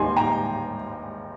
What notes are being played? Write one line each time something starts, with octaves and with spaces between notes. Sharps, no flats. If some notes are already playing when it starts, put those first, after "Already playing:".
Already playing: D#2 D#3 G3 G#5 C6
G5 A#5